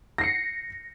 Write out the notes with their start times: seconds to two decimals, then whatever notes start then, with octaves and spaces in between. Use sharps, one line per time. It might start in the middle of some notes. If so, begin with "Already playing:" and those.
0.18 A#6
0.21 C7
0.24 C#7